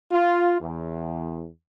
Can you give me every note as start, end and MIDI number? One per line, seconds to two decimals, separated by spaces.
0.11 0.59 65
0.60 1.48 40